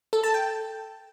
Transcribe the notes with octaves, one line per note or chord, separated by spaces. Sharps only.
A4
A5
G5